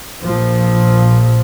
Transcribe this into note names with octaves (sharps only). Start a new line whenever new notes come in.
A#1 A#2 F3